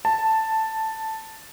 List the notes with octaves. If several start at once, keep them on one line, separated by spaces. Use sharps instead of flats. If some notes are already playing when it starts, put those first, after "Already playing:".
A5